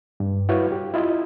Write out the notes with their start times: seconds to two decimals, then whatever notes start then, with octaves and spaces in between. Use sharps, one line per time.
0.20 G2
0.49 E4 F#4 B4 C#5 F5
0.72 G4
0.94 E4 F4 D#5